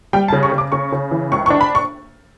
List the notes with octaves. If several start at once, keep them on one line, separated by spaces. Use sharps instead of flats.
G3 G5
A5
C#3
C#6
C#3
D6
C#3 C#6
C#3
E3
C#2 C#6
C#6
D4
B5
C#6